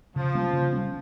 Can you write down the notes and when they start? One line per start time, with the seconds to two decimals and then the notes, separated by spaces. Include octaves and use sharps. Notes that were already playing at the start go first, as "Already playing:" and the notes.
0.16 C#3 F3
0.35 G3 A#3 C#4
0.53 C#3
0.73 G3 A#3 C#4